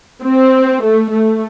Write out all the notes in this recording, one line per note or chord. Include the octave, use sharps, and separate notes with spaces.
C4
A3
A3